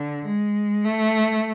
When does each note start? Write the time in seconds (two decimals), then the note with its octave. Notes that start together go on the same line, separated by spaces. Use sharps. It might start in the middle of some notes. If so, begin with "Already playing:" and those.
Already playing: D3
0.25 G#3
0.85 A3